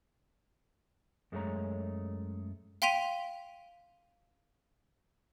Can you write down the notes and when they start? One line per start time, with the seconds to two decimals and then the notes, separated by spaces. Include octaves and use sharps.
1.32 F#2 G#3 A3 G4 C#5 A#5
2.82 F5 G5 C6 B6 D#7 F7